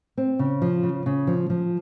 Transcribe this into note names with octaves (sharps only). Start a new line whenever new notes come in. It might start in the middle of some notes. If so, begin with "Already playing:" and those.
C4
C#3
F3
C#3
C#3
F3
F3